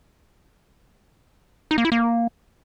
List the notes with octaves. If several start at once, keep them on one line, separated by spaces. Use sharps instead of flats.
D#4
A#3
E4
A#3